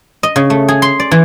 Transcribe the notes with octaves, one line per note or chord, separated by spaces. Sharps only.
D#5
C#3
A3
G#4
C6
D5
E3